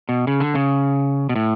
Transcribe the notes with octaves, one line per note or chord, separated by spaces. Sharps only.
B2
C#3
D3
C#3
B2
A2